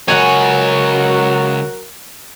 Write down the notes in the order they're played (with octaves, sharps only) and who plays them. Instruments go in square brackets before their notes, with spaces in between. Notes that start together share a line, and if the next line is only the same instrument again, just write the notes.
[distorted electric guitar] C#2 C#5 [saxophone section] F#3 F#4 A#4 [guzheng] F#5 G#5